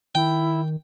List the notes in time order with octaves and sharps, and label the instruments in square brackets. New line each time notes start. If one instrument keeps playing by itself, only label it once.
[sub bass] D#3 [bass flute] E4 [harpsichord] G5